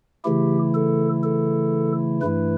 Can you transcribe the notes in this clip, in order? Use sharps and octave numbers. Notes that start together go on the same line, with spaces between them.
C#3 E3 A3 E4 G4
A4
A4
G2 E3 A3 E4 B4